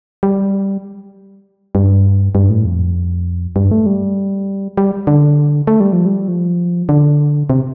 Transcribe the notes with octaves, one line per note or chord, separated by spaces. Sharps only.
G3
G2
G2
A2
F2
G2
A3
G3
G3
D3
A3
G3
F3
G3
F3
D3
C3